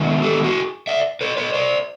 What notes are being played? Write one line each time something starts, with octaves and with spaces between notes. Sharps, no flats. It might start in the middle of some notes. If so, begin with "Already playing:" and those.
Already playing: D#3 G#3 B3 E4
G4 A4
F#4 G#4
D5 E5
B4 C#5
B4 C#5
C5 D5